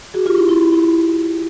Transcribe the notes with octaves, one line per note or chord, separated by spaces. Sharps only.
F#4 G#4
F4 G4
E4
E4
E4
E4
E4